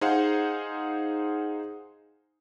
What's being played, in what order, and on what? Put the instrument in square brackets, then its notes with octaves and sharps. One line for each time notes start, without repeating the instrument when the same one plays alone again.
[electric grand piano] D#4 G#4 C5 F5 F#5